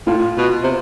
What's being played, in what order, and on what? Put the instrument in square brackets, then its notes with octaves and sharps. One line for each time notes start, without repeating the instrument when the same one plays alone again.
[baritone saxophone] A2 [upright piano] F4
[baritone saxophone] B2
C3